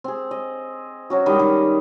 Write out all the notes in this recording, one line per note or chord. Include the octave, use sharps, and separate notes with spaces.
C4 G#4
D#5
F#3 C#4 F#4
D#3 G3 G#3 D#5
D#3